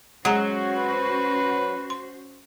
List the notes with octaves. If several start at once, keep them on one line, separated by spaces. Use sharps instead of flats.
F#3 G#3 C#4 F#4 G#4 C5 A#5
B4
C6